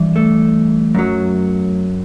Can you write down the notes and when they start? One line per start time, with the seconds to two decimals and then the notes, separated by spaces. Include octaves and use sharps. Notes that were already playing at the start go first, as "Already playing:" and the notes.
Already playing: G2 E3
0.16 A3
0.95 F#2 F#3